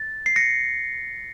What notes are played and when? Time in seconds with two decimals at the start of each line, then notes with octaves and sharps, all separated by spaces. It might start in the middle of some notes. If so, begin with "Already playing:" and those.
Already playing: A6
0.26 C7
0.36 A#6 C#7